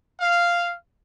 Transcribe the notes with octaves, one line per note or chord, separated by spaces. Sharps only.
F5